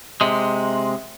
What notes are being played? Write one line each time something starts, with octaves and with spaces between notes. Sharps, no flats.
C3 G#3